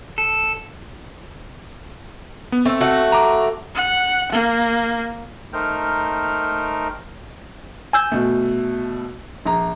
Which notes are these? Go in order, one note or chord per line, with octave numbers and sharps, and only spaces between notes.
A4
B3
A3 C4
A3 F#4
A#5 D6
F#5
A#3
A3 D#4 A#4 C5 G5 F6
G#5 E6 G6
B2 A3
A#1 A#5